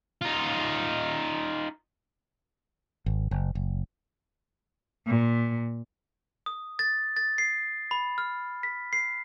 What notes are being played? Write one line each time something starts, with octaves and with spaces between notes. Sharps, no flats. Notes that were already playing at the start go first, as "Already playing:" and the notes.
D#4 F4
G#1
F#1
F#1
A#2
D#6
A6
A6
C7
B5
F6
B6
C7